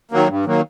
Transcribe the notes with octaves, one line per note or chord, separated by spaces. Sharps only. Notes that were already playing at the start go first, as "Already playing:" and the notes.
D#3 F#3 A#3
G2
D#3 F#3 A#3